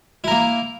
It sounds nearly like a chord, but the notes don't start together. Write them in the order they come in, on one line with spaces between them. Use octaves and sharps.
E4 A#4 A#3